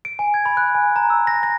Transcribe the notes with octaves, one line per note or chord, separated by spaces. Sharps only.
D7
G#5
G#6
B5
F#6
G#5
A#5
E6
A#6
A#6